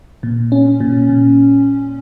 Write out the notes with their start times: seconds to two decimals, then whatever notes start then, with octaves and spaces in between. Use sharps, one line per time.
0.23 A#2
0.52 C#4
0.80 A#2
1.09 A#2